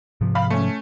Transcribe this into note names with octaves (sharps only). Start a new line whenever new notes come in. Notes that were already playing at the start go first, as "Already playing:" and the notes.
G#2 C3 F3
F5 B5
A3 C#4